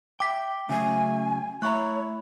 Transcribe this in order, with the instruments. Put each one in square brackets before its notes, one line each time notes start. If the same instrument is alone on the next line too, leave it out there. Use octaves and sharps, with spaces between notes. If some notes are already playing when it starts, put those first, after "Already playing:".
[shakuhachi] E5 [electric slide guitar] G5 [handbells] D6 B6
[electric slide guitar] C#3 F#3 C#4 [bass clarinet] A3 [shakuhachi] G#5
[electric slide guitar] A3 A#5 [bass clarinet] E4 [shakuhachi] C#5 [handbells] E5 C#6 F#6